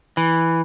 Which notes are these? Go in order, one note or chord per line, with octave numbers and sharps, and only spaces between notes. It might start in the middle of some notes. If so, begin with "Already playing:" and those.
E3